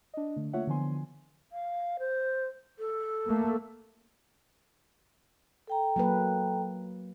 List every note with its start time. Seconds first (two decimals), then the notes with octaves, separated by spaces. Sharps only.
0.14 D4 D#5
0.36 D3 A3
0.53 A3 A#3 F4 C#5 E5 F#5
0.67 D3 E3 F3 B3 G#5 C6
1.52 F5
1.99 C5
2.79 A4
3.26 A3 A#3
5.67 A4 G5 A#5
5.96 F#3 A#3 B4